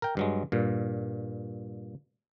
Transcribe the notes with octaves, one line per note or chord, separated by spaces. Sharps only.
A#4 G5
G2 F#3 G#3
G2 A#2